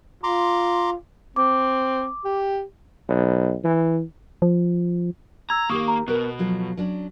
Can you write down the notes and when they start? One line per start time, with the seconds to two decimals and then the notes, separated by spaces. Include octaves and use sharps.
0.23 F4 A#5 C6 D6
1.36 C4 D6
2.25 G4
3.09 B1
3.64 E3
4.42 F3
5.50 A#5 E6 G#6
5.70 D#3 A#3 G4 A#4 C#6 D#6
5.88 A#5
6.08 B2 B3 A#4 F#6
6.39 F3 F#3 A4
6.77 F#3 C#4 D4